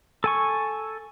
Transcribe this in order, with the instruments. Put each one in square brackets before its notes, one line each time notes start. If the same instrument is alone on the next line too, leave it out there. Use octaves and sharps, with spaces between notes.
[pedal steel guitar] A4 G#5 C#6